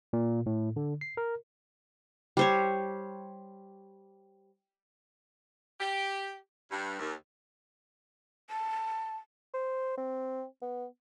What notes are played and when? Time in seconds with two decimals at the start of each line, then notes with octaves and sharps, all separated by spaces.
0.13 A#2
0.46 A2
0.76 D3
1.01 C7
1.17 A#4
2.37 G3 C5 C#5
5.79 G4
6.71 G2
6.99 D#2
8.50 A5
9.54 C5
9.97 C4
10.62 B3